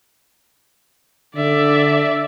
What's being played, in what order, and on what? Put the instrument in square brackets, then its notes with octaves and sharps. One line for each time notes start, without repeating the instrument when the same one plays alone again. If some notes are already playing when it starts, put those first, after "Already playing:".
[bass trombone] D3 [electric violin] D5 E5